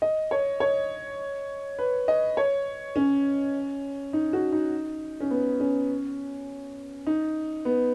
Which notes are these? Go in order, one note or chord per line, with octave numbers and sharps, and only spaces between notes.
D#5
C#5
C#5
B4
D#5
C#5
C#4
D#4
F#4
D#4
C#4
B3
C#4
D#4
B3